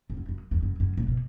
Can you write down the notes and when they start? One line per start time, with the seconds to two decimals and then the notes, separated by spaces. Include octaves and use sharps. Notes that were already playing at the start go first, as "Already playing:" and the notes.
0.10 G#2
0.17 F#2
0.29 F#2
0.51 E2
0.63 F#2
0.80 F#2
0.97 A#2
1.08 B2